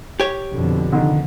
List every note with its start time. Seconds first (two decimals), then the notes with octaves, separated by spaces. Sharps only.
0.20 G4 C#5
0.51 F2 B2 D3
0.92 F1 D3 D#3